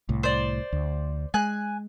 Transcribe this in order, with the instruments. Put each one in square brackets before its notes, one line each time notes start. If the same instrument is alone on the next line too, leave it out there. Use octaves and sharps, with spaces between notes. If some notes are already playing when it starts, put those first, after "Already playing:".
[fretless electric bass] C2 A2
[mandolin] C5 D5
[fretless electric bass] D2
[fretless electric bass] G#3 [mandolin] G#5 F#6